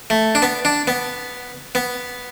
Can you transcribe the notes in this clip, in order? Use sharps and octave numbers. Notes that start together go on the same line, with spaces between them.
A3
D4
B3
D4
B3
B3